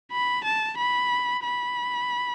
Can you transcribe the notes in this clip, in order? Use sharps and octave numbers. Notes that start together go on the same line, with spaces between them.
B5
A5
B5
B5